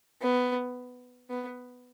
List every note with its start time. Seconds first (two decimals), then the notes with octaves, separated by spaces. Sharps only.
0.21 B3
1.30 B3